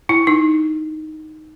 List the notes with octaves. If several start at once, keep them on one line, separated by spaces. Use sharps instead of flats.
E4
D#4